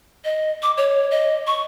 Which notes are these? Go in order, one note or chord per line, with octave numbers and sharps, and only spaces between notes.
D#5
D6
C#5
D#5
C#6